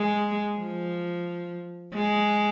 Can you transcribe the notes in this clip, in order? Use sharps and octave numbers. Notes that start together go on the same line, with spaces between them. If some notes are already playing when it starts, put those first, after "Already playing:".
Already playing: G#3
F3
G#3